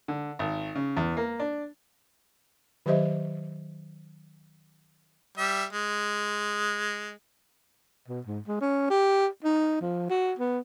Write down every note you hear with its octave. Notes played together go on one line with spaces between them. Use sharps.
D3
G#1
C#3
E2
A#3
D4
D#3 F#3 G4 C5 D#5 E5
G3 E5
G#3
B2
G#2
G#3
C#4
G4
D#4
F3
F#4
B3